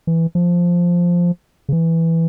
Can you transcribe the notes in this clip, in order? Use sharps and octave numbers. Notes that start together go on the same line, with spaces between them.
E3
F3
C#3
E3